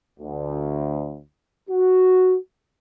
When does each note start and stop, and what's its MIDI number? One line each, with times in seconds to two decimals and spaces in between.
0.19 1.19 38
1.69 2.35 66